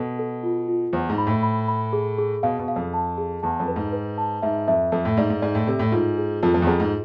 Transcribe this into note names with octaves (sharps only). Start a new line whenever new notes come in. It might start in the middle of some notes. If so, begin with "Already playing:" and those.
Already playing: B2 A4
A4
F4
F4
E2 C5
G#2
B5
A2
B5
B5
G#4
G#4
B2 F5
B2
F5
F2
A5
G#4
E2 A5
F2
B4
G#2
B4
A5
G#2 E5
F2 E5
F2 A4
A2
G#2 D5
G#2
G#2 D5
A2
C3 A4
A2
G#2 F4
G#4
F2 F4
F2
E2
F2 G#4
G#2